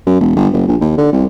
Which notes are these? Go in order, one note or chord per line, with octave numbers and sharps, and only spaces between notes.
F#2
E1
G1
F#1
A#1
D#2
D3
C2